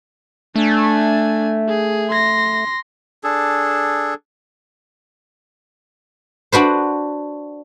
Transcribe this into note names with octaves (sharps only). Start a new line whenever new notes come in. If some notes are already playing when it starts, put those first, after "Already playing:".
A3 D4 G#5
G#4
C6 A#6
D4 G#4 A4
D4 F#4 B4 C5